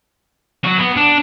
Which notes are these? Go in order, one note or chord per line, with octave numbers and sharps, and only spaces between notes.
F#3 F#4
B3
D4